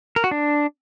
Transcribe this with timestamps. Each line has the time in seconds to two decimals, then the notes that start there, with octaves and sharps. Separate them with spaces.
0.16 A#4
0.24 F#4
0.31 D4